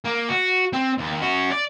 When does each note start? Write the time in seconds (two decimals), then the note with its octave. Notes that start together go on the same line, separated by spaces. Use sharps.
0.05 A#3
0.29 F#4
0.73 C4
0.98 D#2
1.21 C#4 F#4
1.52 D5